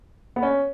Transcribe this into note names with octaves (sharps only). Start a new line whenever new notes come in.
B3
C#4